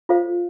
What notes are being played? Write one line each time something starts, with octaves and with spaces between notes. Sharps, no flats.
F4 A4 C5 F5